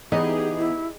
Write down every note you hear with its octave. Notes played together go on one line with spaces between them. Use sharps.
E3 B3 D#4 G4 G#4 D#5
E4